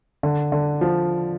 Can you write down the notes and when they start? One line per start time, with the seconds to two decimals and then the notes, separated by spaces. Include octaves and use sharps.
0.23 D3
0.52 D3
0.81 F3